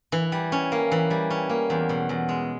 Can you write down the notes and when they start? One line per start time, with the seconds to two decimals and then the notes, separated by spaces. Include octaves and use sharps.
0.12 E3
0.32 G3
0.52 C#4
0.72 A#3
0.91 E3
1.10 G3
1.30 C#4
1.50 A#3
1.70 E2
1.89 B2
2.09 E2
2.29 G#3